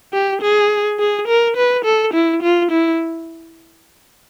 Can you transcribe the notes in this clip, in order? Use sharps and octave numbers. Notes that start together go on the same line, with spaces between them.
G4
G#4
G#4
A#4
B4
A4
E4
F4
E4